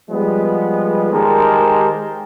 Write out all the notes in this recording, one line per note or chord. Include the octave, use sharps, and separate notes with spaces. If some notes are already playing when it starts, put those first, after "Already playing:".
F3 G3 G#3 B3
D#3 G#3 G4 A#4 C5 A5